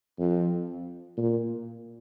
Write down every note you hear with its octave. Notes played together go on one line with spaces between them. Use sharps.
F2
A#2